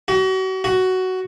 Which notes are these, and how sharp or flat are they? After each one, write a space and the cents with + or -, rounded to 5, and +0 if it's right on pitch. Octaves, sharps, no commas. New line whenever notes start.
F#4 +35
F#4 +10